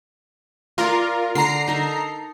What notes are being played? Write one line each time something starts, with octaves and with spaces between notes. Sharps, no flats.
F4 A#4 D5 C6
D3 A#5 C7
D#4 A4 A#4